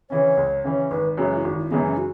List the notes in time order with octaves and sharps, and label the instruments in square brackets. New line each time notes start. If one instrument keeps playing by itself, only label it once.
[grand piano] C#3 E3 C#4 [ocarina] C#5
[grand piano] C#2
C#3 E3 C#4
[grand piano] G#1 [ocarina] B4
[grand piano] F#2 C#3 E3 G#3 [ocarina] F#4
[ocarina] E4
[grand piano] G#1 [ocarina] F#4
[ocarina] E4
[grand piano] F#2 C#3 E3 G#3 [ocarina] B3
[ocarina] C#4
F#4